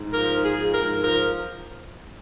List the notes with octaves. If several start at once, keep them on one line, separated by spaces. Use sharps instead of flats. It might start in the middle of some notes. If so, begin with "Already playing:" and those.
Already playing: G#2
F3 A#4
G#2
G#4
F3
A#4
G#2
F3 A#4